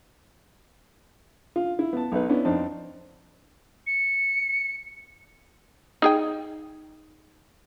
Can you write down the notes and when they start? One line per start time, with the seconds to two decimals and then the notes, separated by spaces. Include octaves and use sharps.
1.56 F4
1.79 E4
1.93 B3 A5
2.12 B1 D#4 B4
2.29 B3 C#4 D4 E4
2.45 F2 C4 D4 D#4 A5
3.87 C#7
6.02 D#4 G#4 G5